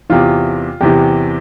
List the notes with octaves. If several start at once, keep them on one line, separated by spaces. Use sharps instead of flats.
E2 C3 E3 F4
E2 C3 E3 G4